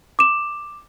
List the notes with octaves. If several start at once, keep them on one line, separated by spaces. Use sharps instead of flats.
D6 E7